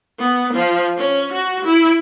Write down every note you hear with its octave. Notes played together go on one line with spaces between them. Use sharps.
B3
F3
C#4
F#4
E4